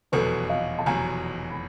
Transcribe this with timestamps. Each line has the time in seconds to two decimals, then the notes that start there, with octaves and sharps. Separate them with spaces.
0.12 F1 E2 B2 F#3 A4 B4
0.49 D#5 F5
0.79 A5
0.86 F1 E2 B2 F#3 G#5 A#5
1.50 B5